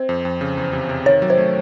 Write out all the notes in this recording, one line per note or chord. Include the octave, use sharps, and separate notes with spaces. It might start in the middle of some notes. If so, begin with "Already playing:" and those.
Already playing: C4 C5
F2
F2
C#3
E2
C3
C3
D#3 C#5
F#3
C5
A3